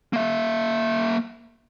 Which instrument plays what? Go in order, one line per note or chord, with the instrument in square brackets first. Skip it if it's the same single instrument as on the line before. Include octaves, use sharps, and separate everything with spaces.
[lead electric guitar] A#3 E5